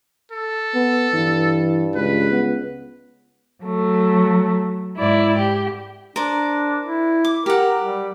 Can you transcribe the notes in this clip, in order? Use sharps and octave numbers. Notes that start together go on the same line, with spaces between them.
A4
B3
G2 E3
C#2 B4
B3
F#3 A3
G#2 E4 D5
G4
D4 A#4 C5 D5
E4
D6
G4 A#4 F#5
G3